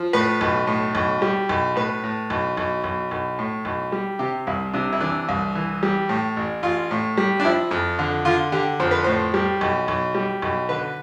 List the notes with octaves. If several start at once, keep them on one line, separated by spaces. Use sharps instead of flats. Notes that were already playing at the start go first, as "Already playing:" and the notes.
Already playing: F3
A2 B4
B1
A2
B1
G3
B1
A2 B4
A2
B1
B1
B1
B1
A2
B1
G3
C3 G4
C2 E4
C3 D4
E4
E3 D4
C2
E3
G3
A2
A1
A1 F4
A2
G3
D4
F3 E4
F2
D3
D3 F4
D3 G4
F2 C5
B4
A2 C5
G3
B1
B1
G3
B1
D3 B4